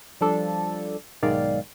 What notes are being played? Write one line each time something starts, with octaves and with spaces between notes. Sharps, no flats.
F3 G3 D4 A4
B1 G#2 D#3 D5 F5